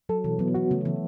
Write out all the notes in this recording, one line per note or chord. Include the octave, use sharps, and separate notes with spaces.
F#3 A4
B2 E3
F#3 B3
F#3 F#4
C#3 A3
E3 B3